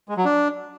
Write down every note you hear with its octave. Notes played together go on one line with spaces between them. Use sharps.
G#3
F#3
D4